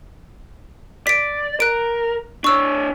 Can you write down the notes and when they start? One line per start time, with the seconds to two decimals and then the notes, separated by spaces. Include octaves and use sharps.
1.07 D5 B6 D7
1.60 A#4 F#6 D7
2.44 D4 C#5 C#6 E6